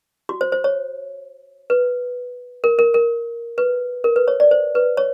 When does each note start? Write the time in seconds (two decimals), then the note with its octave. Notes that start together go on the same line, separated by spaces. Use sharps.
0.29 F#4
0.41 C5
0.52 C5
0.64 C#5
1.70 B4
2.64 A#4
2.79 A#4
2.94 A#4
3.58 B4
4.04 A#4
4.16 B4
4.28 C#5
4.40 D5
4.51 C5
4.75 B4
4.97 C#5